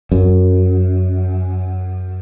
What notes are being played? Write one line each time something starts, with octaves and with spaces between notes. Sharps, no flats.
F#2